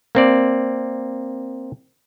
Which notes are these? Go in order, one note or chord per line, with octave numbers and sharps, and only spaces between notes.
A#3 C4 D5